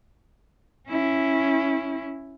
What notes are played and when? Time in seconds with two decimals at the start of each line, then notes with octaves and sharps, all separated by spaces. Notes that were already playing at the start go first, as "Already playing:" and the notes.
0.89 C#4 E4